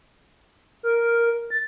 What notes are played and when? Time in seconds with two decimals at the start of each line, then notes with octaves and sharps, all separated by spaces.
0.83 A#4
1.50 A6